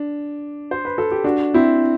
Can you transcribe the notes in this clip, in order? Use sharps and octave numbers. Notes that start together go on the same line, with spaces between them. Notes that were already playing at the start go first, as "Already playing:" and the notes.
Already playing: D4
C5
B4
A4
G4
D4 F#4
C4 E4